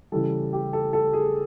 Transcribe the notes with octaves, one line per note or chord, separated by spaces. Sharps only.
C#3 E3 G3 A4
G4
A4
A4
G#4